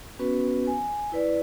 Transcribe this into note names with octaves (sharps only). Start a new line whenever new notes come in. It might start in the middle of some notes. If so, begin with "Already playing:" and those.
B3 C#4 F#4 B4
G#5
E4 B4 D5